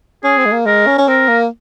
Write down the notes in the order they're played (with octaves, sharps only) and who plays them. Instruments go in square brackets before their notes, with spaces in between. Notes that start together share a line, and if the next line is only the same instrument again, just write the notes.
[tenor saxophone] C#4 [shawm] G#4
[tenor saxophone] C4
G#3
A#3
[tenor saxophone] G#3 [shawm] A#4
[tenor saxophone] C#4
C#4
[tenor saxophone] C4 [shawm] A#4
[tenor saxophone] A#3